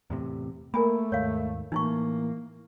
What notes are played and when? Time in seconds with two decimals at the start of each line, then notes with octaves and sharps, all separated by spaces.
0.10 E2 A2 C3
0.74 A3 A#3 A#4 G#5 B5
1.12 D#2 G#2 C#5 F5
1.72 A2 E3 A#3 D#4 E4 C#6